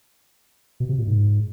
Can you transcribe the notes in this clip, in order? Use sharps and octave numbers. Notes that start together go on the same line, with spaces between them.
B2
C3
A#2
G#2